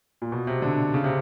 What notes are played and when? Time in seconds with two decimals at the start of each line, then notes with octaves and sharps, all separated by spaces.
0.22 A#2
0.32 B2
0.47 C3
0.62 D3
0.94 C#3
1.04 C3